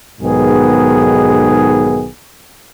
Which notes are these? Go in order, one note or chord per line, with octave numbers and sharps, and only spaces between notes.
B1 G#2 D#3 B3 G#4